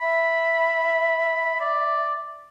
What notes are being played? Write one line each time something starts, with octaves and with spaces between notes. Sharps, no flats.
E5 B5
D5